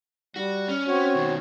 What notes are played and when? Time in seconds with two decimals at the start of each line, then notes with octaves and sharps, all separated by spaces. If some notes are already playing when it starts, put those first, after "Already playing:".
0.36 G3 F#4
0.68 C#4
0.87 C4 F#4 C#5
1.15 B2 D#3